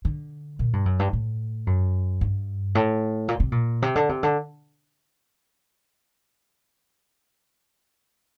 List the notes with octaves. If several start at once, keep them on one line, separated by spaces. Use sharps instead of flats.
D3
A#2
G2
F#2
G2
A2
F#2
G2
A2
A#2
C3
A#2
C3
D3
C3
D3